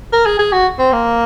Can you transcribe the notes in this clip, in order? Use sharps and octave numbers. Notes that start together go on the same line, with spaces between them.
A#4
G#4
G#4
F#4
C4
A#3